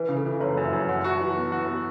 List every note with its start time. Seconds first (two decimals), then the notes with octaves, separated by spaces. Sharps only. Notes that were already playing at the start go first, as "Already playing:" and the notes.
Already playing: E3 B4
0.09 C#3
0.17 A4
0.26 E3
0.40 F#1 C#5
0.57 F#2
0.65 E5
0.73 F#2
0.88 F#2 F#5
1.04 F#4
1.12 A5
1.21 E3
1.36 B3
1.52 F#4
1.67 B3